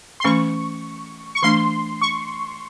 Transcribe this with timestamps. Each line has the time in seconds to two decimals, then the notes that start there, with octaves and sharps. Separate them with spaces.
0.20 C6
0.24 E3 A3 C#4 C#6
1.35 C#6
1.43 E3 A3 D4 C6
2.01 C#6